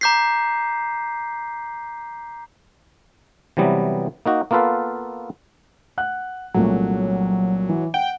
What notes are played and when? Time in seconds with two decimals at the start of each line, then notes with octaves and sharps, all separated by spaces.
0.01 A#5 D6 G6 B6 C7
3.57 C3 E3 F#3 G3 B3
4.26 A#3 D#4 F#4
4.51 A#3 B3 F4 A4 B4 F5
5.98 F#5 F#6
6.54 C2 A#2 F#3 A3
7.69 E3
7.94 F#5 G5